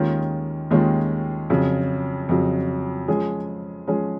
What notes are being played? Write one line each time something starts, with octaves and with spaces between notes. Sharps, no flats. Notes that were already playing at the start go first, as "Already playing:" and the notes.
Already playing: D#2 D#3 G#3 C#4 F4
D#2 D#3 G#3 C#4 F4
F2 C#3 F#3
F2 C#3 F#3
F3 G#3 C#4 G#4
F3 G#3 C#4 G#4